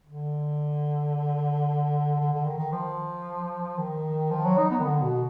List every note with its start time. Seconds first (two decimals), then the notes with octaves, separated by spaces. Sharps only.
0.07 D3
2.19 D3
2.33 D3
2.45 D#3
2.58 D#3
2.72 F3
3.78 D#3
4.31 F3
4.44 F#3
4.58 D#4
4.71 B3
4.80 D#3
4.84 D3
5.02 B2